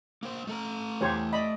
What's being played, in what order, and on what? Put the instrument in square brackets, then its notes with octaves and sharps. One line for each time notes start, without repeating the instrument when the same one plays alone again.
[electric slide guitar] A#3 C5
A3 A4 A#5
[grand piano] E2 [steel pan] G4 C5 C#5
[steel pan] D5 B5 [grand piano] D#5